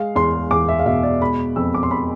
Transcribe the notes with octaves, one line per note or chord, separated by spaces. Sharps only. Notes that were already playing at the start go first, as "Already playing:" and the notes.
Already playing: G#3 F5
E2 C6
E2 D6
E5
F5
B2 E5
D5
G#3 B5
F2 E6
D6
C6
B5